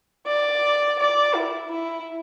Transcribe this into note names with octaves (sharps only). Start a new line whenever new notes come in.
D5
D5
E4
E4